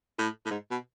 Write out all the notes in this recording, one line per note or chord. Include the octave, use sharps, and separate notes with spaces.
A2
A2
G#2
B2